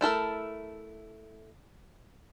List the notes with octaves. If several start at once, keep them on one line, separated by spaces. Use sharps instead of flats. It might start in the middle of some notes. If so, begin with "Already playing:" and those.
A3 E4 A4 A#4